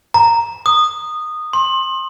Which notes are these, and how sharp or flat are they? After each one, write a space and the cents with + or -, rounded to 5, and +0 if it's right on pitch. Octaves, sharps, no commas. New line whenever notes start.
A#5 -5
D#6 -15
C6 +30